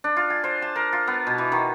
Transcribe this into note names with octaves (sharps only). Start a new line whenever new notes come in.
D4
F4
G#5
C5
A5
A#4
F4
B3
B2
E3
D#3